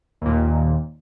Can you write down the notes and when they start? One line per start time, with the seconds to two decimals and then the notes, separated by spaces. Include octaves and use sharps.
0.21 D#2 A#2